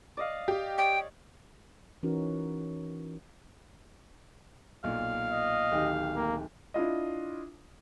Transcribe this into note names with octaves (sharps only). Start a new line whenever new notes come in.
D5 D#5 F5
G4
C#5 D5 G5
E3 C#4 D#4 F#4 A#4
B1 A#2 F5
D#5
D1 D#3 G4
A#3
D4 E4 F4 D#5